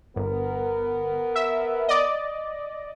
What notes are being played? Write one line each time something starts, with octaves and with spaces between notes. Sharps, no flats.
G1 B3 A#4
E5
D5 D#5